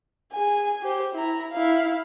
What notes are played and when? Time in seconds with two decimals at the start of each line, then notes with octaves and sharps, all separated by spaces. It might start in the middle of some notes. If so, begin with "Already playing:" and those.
0.32 G#4 G#5
0.82 G4 C5
1.15 E4 A#5
1.52 E4 F5